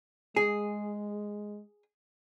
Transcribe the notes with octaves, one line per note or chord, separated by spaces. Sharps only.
G#3 G#4